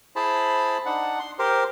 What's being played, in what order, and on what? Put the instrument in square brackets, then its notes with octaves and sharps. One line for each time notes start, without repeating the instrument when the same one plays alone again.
[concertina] E4 G#4 C5 A5 B5
D4 D#4 F#5
C6
G4 A#4 C5